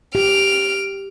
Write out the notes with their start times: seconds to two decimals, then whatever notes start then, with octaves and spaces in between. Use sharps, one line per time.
0.15 G4 F6 D7